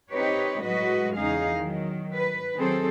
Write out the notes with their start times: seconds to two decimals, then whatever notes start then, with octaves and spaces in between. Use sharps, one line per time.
0.11 C4 D#4 G4 B4 C#5
0.62 A2 F#3 G#3 F#4 B4 D#5
1.16 E2 C#3 D#4 G#4 F5
1.54 D#3 F#3
2.15 B4
2.55 D#3 F#3 C4 G#4 A4 C5